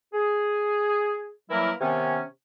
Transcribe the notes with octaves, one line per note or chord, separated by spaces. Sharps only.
G#4
E3 F#3 G3 A#3 E4 A#4
C3 D#3 B3 C#4